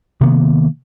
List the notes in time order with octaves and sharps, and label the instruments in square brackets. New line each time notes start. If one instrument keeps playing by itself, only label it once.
[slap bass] C3 D#3 A#3 B3